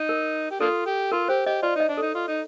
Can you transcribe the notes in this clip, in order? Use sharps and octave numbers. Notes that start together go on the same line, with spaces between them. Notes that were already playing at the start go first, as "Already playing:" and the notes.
Already playing: D#4
A#4
G4
A#3 D4 F4 A4
G4
F4 A#4
G4 C5
G4 D#5
F4 D5
D#4 D#5
D4
D#4 A4
F4
D#4